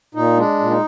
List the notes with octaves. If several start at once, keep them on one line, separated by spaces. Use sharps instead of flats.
A#2 D#4
G#3 D4
A#2
D#4